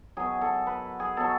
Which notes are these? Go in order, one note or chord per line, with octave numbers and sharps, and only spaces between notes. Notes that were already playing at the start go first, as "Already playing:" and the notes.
B2 F#3 G#4
A4
B4
G#4
B2 F#3 A4